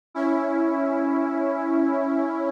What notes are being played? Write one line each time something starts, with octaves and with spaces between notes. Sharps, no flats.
C#4 E4